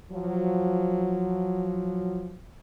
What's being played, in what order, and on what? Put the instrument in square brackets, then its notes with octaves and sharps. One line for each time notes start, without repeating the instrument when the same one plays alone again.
[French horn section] F3 F#3